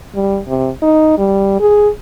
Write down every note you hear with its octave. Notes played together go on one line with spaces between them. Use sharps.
G3
C3
D#4
G3
G#4